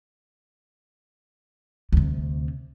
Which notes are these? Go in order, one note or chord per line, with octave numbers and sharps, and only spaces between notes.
D2 C3